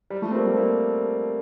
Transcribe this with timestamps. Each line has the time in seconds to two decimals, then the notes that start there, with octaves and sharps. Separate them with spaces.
0.10 G3
0.22 F3 A3
0.31 C4
0.34 G3 A#3
0.46 A3 C4
0.57 G3 A#3